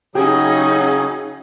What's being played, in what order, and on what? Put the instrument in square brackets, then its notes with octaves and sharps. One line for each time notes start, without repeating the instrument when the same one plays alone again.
[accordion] C#3 F#3 G#4 [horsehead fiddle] C#4 D#4 [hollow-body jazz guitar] G4